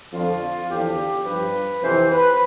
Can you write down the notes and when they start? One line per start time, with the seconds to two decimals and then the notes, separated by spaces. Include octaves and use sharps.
0.12 F2 D3 F3 F4
0.69 E2 D3 F3 G4
1.26 G2 F3 B4
1.82 F2 C3 E3 C5
2.10 B4